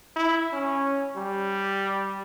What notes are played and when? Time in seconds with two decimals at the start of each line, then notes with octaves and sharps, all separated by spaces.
0.16 E4
0.53 C#4
1.16 G3